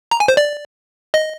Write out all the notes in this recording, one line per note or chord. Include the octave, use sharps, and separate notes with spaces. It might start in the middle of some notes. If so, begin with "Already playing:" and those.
A#5
G#5
C5
D5
D#5